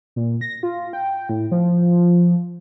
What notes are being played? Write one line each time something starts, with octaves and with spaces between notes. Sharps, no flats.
A#2
A#6
F4
G5
A2
F3